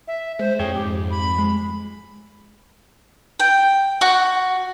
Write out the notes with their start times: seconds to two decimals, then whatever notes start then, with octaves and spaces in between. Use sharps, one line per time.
0.07 E5
0.39 G#3 C5
0.59 F2 G#4 C#5 G5
0.75 G#2 G4
1.10 B5
1.38 G#3
3.40 G5
4.01 F#4